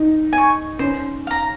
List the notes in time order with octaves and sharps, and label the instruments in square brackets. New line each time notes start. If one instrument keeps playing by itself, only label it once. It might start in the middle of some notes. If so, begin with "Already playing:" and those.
Already playing: [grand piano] D#4
[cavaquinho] G#5
C#6
[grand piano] C#4 [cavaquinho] C5
[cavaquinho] F5 A#5